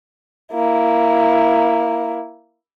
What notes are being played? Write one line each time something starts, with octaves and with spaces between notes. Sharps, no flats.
A#3 E4